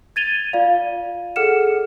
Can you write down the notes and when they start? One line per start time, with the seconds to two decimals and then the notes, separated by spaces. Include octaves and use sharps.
0.16 G#6 A6 D#7 F7 G7
0.53 F4 D5 F5
1.36 G#4 A4 F#5 F6 C#7 E7